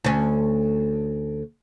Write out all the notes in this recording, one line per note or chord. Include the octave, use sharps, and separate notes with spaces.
D2 C#4